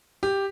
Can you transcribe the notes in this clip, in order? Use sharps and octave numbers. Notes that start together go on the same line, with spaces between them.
G4